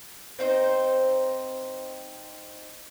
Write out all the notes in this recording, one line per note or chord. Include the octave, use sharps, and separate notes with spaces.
C4 D#4 C5